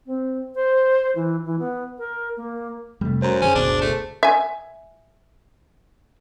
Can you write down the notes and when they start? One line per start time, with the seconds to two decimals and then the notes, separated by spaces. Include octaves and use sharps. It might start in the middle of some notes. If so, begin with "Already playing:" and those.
0.06 C4
0.55 C5
1.15 E3
1.45 E3
1.58 B3
1.98 A#4
2.37 A#3
3.01 F2 C3 G3 A3
3.22 F#2 C5 A#5
3.42 F#2 D#3 C#4 G#4 C5
3.55 F#1 D2 B2 D4
3.81 A3
4.23 E5 G#5